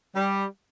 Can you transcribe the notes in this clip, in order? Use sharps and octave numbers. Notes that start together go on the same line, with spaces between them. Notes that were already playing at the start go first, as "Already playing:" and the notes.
G3